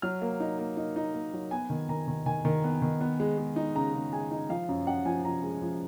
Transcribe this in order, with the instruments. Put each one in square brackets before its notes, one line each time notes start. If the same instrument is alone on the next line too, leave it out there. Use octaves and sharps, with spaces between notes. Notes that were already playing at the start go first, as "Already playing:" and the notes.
[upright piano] F#3 F6
A#3
D#4
A#3
D#4
D#4
A#3
F#3
B3 G#5
D#3
D#3 A#5
D#3
D#3 G#5
D#3
B3
D#3
B3
G#3
G#3
D#4
C#3 A#5
C#3
G#3 G#5
D#4
F3 F5
F#2
F#2 F#5
F3 G#5
F3 A#5
G#3
F3